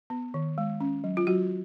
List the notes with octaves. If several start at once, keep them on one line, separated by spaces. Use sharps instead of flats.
B3
D#3
G#3
C#4
F#3
F4
F#3 F#4